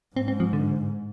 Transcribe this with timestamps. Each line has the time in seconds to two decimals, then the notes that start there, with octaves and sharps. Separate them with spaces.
0.16 G#2 C4
0.28 C4
0.40 F3
0.53 D3